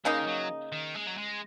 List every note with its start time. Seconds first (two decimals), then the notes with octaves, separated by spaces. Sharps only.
0.05 C#3 G#3 A#3 D#4
0.19 D#3
0.27 F#3
0.72 D#3
0.95 G#3
1.07 F#3
1.17 G#3